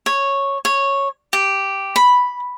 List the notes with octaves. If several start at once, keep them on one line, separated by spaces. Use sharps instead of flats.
C#5
C#5
G4
B5